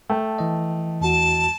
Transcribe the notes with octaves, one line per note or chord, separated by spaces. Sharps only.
A3 G5 A5
E3 D#5
E2 F#4 A5